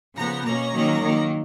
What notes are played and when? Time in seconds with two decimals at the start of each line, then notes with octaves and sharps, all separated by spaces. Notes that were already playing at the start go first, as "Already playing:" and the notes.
0.15 C#3 F3 B3 A#5
0.43 B2 A#3 C#4 A#5
0.72 D#3 F#3 A#3 C#4
1.00 D#3 F#3 A#3